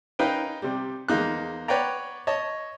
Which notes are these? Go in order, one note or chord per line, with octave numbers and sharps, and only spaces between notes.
C#4 D#4 A#4 B4 F5 G5
C3 G3
E2 G#3 A#3 D#4 F#6
B4 C#5 D5 F#5 G5 A#5
C#5 D#5 A5